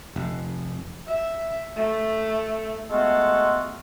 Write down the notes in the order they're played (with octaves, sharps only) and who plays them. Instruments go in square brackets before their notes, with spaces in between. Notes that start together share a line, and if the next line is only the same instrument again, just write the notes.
[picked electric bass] F1
[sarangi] E5
A3
[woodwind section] G#3 A3 B3 F4 F#4 A4